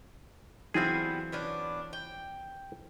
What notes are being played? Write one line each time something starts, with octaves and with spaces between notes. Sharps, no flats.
E3 F#3 G3 B3 C4 E4 F4 G#4
B3 C#4 D4
G5